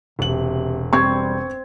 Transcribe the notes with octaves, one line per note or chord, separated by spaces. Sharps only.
E1 C3 F#7
G3 C4 C#6 G#6